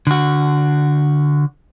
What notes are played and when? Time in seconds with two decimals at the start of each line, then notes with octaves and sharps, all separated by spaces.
0.07 D3 F#4